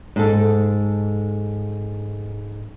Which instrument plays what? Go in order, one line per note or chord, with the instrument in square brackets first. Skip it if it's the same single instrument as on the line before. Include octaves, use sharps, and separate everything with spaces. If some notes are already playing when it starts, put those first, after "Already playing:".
[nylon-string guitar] G#2 A4